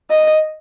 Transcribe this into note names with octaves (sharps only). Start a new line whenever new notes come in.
D#5